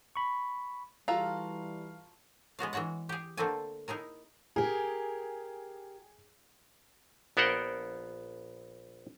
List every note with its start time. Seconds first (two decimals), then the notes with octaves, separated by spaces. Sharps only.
0.16 B5 C#6
1.08 E3 G3 F4 F#4 A4 F5 A#5
2.59 G#3 B3 F#4 F5
2.73 E3 G#3 F#4 C#5 F#5
3.09 G4 G#4
3.37 D3 A3 A#3 C4 A4 G#5
3.88 D#4 E4 G#4 A#4
4.56 G4 G#4 A#4
7.37 A#1 B3 A#4 C5 F#5 G5